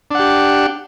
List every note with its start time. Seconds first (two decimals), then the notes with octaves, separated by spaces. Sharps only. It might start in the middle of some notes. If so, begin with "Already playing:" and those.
0.11 D4
0.15 F#5
0.19 G4